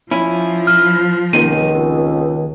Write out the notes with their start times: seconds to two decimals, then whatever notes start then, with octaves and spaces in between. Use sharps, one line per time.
0.11 F3 C#4 E4
0.67 F6
1.33 C#2 C3 D#3 A#3 D#7